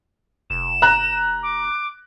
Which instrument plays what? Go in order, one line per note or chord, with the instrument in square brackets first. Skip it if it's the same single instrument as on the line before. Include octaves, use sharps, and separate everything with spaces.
[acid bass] F1 [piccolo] E7
[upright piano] A#5 F#6
[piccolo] D6